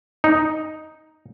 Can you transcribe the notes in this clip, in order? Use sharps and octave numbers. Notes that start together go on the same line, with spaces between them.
D#4